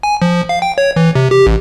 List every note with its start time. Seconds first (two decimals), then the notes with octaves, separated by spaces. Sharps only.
0.03 G#5
0.22 F3
0.49 F5
0.62 G5
0.78 C#5
0.96 E3
1.15 C3
1.31 G4
1.46 A1